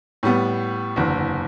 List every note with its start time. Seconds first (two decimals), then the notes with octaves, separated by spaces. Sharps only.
0.23 A2 G3 B3
0.96 F#1 E2 D3